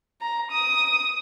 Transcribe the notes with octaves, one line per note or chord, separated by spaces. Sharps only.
A#5
D#6